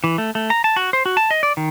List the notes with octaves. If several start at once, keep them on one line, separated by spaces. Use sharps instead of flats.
E3
A3
A3
A#5
A5
F#4
C5
F#4
A5
D#5
D5
D#3